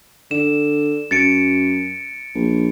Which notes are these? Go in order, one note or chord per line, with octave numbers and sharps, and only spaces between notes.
D3 E7
F#2 A6 C#7 D7
A#1